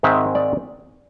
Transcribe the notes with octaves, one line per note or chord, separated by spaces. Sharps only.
G#2 D#3 G#3 C4 E5
D5